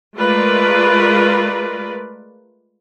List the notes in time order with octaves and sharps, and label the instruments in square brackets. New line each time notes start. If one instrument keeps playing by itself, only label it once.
[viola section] G#3 A3 F4 A#4 B4 D5